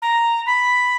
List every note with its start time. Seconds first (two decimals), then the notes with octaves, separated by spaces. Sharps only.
0.02 A#5
0.46 B5